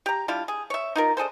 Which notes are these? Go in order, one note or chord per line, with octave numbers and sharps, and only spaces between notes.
G4 A#5
G3 D4 E4 F4
G#4
C#5 E5
D#4 F4 A#4
D4 G#4 A4 C5